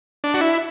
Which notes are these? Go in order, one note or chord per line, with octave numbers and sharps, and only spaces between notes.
D4
F#4
E4